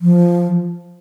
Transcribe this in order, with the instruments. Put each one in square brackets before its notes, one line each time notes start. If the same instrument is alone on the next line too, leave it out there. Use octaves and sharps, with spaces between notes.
[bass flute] F3